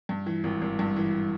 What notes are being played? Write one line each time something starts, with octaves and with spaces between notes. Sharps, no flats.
G2
E3
G#1
G#1
G2
E3